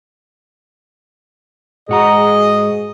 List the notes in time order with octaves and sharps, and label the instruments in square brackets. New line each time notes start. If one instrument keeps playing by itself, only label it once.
[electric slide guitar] G#2 F#4 A#5 [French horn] G#4 [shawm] D#5